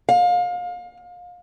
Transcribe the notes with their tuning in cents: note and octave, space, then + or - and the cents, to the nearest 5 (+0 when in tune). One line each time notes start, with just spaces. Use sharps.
F5 +30